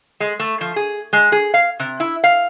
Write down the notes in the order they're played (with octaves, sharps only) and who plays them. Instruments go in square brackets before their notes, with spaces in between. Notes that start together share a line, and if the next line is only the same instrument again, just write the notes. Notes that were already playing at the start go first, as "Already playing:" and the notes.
[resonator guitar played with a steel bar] G#3
A3
F3
G#4
G#3
G#4
F5
C3
E4
F5